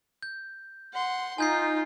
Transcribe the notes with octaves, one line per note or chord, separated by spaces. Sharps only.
G6
F#5 C6
D#4 F4 G#5 G6 C7